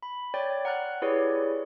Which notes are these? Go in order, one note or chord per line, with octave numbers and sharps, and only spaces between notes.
B5
C#5 D5 G5 A6
F#5 A#5 F6 F#6
E4 G4 G#4 B4 C#5 D5